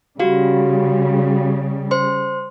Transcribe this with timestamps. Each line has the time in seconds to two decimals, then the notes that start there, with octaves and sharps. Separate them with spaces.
0.20 C#3 G3 F#4 G4 F5
1.91 C5 C6